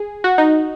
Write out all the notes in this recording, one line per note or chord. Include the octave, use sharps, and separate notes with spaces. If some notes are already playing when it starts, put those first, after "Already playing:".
Already playing: G#4
F#4
D#4